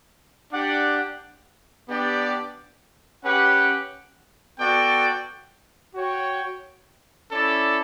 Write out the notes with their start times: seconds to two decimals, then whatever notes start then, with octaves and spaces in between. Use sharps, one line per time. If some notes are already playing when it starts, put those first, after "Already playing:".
0.51 D4 G4 D5 F#5
1.87 B3 D4 G4 D5
3.23 C#4 G4 B4 F#5
4.59 B3 F#4 A4 D5 G5
5.95 F#4 C#5 G5
7.31 C#4 E4 A4 D5